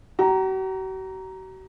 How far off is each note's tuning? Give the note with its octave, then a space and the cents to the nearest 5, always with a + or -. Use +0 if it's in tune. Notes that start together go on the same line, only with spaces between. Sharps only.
F#4 +45 A#5 +0